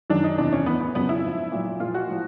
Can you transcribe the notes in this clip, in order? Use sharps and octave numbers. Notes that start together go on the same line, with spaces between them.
F#2 D#3 F#3 D4
D#4
E2 C3 E3 D4
C#4
A2 E3 B3
B3
F2 C#3 F#3 B3
E4
G#2 F3
A#2 F#3
A#2 F3 F4
F#4
A2 F3